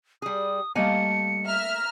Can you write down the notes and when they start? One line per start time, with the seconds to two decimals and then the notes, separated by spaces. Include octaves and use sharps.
0.22 G3 G#4 D#6
0.75 G3 A3 A#3 D#5 F5 G#5 C#7
1.46 E5 A#5 F6